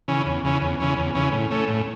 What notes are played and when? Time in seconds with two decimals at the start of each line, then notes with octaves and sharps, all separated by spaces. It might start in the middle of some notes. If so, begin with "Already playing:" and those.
0.08 C#3 E3 C#4
0.26 E2
0.45 C#3 E3 C#4
0.61 E2
0.80 C#3 E3 C#4
0.97 E2
1.15 C#3 E3 C#4
1.32 A2
1.51 A3 C#4
1.67 A2